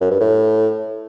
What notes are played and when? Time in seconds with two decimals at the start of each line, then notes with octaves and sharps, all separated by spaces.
0.01 F#2
0.11 G2
0.20 A2